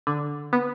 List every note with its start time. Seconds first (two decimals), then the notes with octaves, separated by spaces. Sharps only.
0.07 D3
0.53 B3